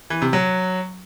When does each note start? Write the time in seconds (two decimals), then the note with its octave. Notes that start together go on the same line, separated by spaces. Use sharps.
0.10 E3
0.22 C3
0.33 F#3